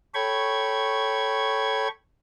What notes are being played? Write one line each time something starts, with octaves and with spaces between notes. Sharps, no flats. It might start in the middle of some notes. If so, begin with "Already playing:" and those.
A4 C#5 G5 B5 C#6 G#6